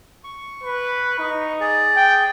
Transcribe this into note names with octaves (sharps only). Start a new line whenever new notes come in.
C#6
B4
D#4
G#4 D5
G5